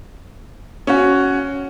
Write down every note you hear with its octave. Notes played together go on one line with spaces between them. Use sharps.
C#4 F#4